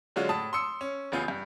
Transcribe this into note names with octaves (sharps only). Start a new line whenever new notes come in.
D3 F#3 G#3 C#4 F4 F#4
A2 A5 D#6
C6 D#6 E6 C#7
C#4
A1 C#3 B3 F4 G#5 G6
G2